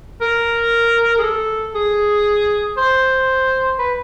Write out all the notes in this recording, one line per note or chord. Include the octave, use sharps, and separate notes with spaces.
A#4
G#4
A4
G#4
C5
B4